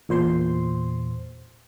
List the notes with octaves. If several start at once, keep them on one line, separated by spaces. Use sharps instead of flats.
E2 A#2 C5 C6